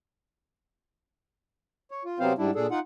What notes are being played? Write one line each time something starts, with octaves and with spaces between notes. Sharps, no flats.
C#5
F4
C3 F#3 B3 C4 C5 F5
G#2 G3 D4 E4
A#2 D4 G#4 A4
D#4 F4 F#5